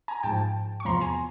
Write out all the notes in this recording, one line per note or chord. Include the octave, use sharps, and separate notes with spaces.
G#5 A#5
G#2 F3 G5 A5
C#6
E2 C3 F3 A#5 C6
G#5 A#5